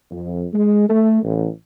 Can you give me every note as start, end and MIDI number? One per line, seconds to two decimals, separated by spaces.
0.10 0.43 41
0.53 0.87 56
0.89 1.21 57
1.23 1.48 33